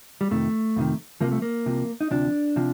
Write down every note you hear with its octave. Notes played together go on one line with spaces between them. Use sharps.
G3
F2 C3 D#3 A3
F2 C3 D#3
C2 C3 F3 A#3
A3
A#3
C2 C3 F3
D#4
D2 C3 F3 D4
C3 F3